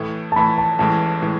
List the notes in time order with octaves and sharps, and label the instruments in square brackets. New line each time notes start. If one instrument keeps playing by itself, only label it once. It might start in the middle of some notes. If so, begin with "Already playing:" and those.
Already playing: [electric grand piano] A2 E3 A3
[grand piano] A5
[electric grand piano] A2 E3 A3 [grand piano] B5
[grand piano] A5
[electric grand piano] A1 A2 E3 G#3 [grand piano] A5
[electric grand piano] A2 E3 G#3